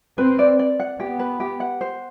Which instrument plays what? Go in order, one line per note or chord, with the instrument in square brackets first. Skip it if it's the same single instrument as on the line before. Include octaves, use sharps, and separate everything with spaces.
[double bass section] C4 [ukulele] B4
[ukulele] D5
D5
F#5
[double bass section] B3 [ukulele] G4
[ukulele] B4
G4
F#5
C5